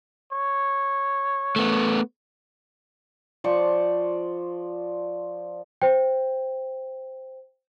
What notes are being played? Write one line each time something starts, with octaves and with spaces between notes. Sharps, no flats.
C#5
A3 B3
F3 C5 D5 C#6
C5 G5